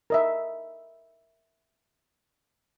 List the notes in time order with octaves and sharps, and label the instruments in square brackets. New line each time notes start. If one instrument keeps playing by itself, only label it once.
[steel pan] A#4 D#5 E5